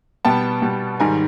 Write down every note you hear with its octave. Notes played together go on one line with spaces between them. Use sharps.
B2 G3 B3 G5 A5
B2 G3 B3
G#2 D#3 G3 G#5 A#5